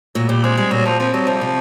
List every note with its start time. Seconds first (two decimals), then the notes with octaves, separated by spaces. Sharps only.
0.15 A#2 F#3
0.29 A#2 G3
0.44 G#3 C4
0.57 G3 G#3
0.71 A#2 F#3
0.85 A#2 F3
0.99 F3 C4
1.13 F#3 G3
1.27 C3 F3
1.41 C3